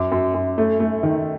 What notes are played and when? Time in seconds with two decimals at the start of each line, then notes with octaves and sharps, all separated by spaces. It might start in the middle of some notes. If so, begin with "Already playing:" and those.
Already playing: F#2 D6
0.12 F#2
0.34 F#2
0.58 A3
0.80 A3
1.03 D#3